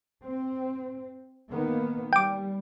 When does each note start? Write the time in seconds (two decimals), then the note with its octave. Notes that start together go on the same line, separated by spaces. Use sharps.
0.24 C4
1.49 D#3 A#3 B3
2.13 G3 G5 D6